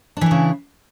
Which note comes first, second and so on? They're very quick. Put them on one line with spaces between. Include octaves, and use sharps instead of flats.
D4 E3 E4 C#3